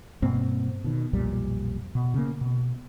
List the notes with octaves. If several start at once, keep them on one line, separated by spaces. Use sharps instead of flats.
G2 B2 A#3 C4
B2 D#3
B1 F2 A#2 G3
B2
C#3 A#3
B2